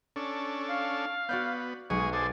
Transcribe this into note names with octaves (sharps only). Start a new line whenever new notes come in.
C#4 D4 A4
F5
B3 F#4 D5 G6
B1 G#3 G#4 C#6
G#4 A4 C5 D5